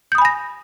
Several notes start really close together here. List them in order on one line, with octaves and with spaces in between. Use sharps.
G6 D#6 B5 G#5 A#6